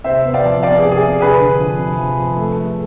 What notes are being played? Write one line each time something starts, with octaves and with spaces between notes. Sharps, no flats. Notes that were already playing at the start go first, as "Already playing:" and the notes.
C3 C5 E5
B3
D5 F5
F3
B3 D5 F5
C3 G#4
G#4
C3
D3 G#4 B4
D3
F3
C3
F3
F3
A3
A3